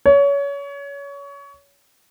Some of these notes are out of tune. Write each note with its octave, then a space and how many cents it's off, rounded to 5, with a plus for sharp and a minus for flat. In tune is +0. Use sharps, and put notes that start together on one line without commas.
C#5 +25